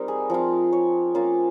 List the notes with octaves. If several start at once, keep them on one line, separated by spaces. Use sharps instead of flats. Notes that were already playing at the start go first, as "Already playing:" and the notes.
Already playing: G3 C4 D#4 A#4
G#4
F3 C4 F4
C#5
A#3 C#4 F4 F5